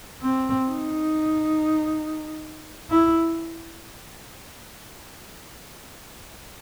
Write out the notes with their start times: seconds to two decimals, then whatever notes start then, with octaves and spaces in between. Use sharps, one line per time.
0.22 C4
0.67 D#4
2.90 E4